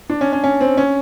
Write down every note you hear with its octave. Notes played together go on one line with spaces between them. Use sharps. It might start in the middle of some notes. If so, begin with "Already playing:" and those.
D4
C#4
C#4
C#4
C4
C#4